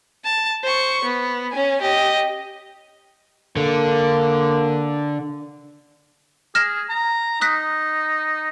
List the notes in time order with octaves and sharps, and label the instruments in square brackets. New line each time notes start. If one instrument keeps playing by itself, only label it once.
[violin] A5
C5 C#6
B3
C#4 G#5
G4 D#5
[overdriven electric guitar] D3 [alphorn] A#3
[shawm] G#4 [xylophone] F6 A#6 E7
[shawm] A#5
[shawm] D#4 [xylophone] D#6 F#6 B6